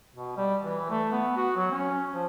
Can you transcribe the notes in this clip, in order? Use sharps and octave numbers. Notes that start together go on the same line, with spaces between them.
B2
G3
E3
A3
B3
F#4
F#3
C#4
F3